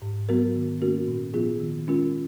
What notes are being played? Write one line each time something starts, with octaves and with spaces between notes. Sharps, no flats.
G#2
F#3 B3 F#4 A#4
D#3
A#3 C#4 F#4 A#4
A#2
F3 B3 F4 G#4
D#3
G#3 C#4 F4 A#4